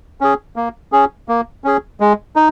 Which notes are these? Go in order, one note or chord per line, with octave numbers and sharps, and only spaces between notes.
C#4 G#4
A#3
C#4 G#4
A#3
C#4 G#4
G#3
D#4